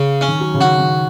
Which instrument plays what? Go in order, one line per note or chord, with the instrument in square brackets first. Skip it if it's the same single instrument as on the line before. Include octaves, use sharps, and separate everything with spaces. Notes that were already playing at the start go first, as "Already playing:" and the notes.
Already playing: [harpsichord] C#3
C#4
[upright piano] D#3
F#3
C#3
[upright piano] D#3 [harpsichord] F#4
[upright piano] D#3